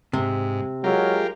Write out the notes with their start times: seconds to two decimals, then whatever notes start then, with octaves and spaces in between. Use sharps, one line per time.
0.13 G#2 C3
0.84 F#3 G#3 F4 G4 A#4